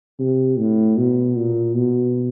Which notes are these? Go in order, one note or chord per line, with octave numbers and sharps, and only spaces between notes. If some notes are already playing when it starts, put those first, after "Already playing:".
C3
A2
B2
A#2
B2